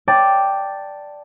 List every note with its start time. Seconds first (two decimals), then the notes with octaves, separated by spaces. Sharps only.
0.08 D5 G5 A5